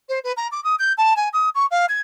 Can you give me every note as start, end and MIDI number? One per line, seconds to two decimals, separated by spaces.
0.09 0.19 72
0.24 0.32 71
0.37 0.48 82
0.52 0.63 86
0.64 0.75 87
0.79 0.93 91
0.98 1.16 81
1.16 1.29 80
1.33 1.49 87
1.55 1.66 85
1.71 1.86 77
1.89 2.01 92